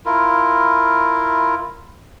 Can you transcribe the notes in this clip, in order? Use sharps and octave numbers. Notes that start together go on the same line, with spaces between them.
E4 F4 A#4